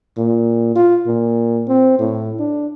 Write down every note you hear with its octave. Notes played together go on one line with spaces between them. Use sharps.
A#2
F4
A#2
C4
A2
D4